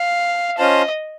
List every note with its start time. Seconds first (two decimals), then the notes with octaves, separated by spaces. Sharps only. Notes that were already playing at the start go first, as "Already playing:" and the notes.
Already playing: F5
0.58 C#4 F4 C5 D#5 F5 A5